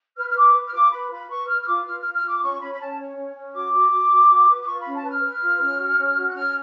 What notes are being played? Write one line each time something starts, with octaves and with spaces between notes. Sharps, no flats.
B4 F6
F6
B4 D6
B4
F6
F4 D6
B4 B5
F4 B5
B4 C#6
B4 F6
F6
F4 D6
F4 F6
F4 F6
F6
F4 D6
C#4 C#6
C#4 B5
B5
C#4 A5
C#5
C#4
C#4
F#4 D6
F#4
F#4
F#4
F#4
B4
D6
F4 C#6
C#4 B5
A5
B4 F6
B4
F4
C#4
F#4
C#4
F#4
F#6
C#4 F6